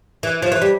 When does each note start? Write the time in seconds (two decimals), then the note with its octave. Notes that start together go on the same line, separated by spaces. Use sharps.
0.23 E3
0.42 F3
0.52 E3
0.62 G3